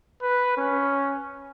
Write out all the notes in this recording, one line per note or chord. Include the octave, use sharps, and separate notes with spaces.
B4
C#4